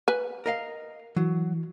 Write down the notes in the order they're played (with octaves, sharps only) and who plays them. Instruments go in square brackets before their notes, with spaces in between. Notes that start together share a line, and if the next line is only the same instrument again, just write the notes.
[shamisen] B4 G#5
[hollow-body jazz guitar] A#4 D#5 F5
[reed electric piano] E3 [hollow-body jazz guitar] F#3